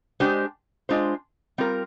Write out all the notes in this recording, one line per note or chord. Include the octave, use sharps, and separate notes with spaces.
G#3 D4 G4 C5
G#3 D4 F4 C5
G3 C4 F4 A#4